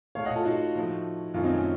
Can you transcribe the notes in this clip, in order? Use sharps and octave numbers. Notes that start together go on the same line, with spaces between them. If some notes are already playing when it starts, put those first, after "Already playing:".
A2 A3 C#5 F5
D#5 F#5
F4 A4
D#4 F#4
A2 F3 A3
F#2 D#3 A3 C#4 F4
C4 D#4
C#4